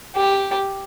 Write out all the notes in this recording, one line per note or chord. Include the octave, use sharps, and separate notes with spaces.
G4